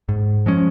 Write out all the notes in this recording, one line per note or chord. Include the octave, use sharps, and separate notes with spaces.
G#2
F3 G#3 C#4